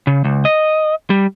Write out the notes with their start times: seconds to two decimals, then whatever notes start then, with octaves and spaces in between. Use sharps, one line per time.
0.07 C#3
0.24 C#2
0.45 D#5
1.10 G3